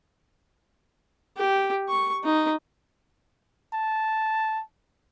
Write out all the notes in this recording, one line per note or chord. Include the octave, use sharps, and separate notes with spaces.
G4
C#6
D#4
A5